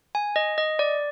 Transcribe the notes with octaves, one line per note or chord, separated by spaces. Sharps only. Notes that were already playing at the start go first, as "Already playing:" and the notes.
G#5
D#5
D#5
D5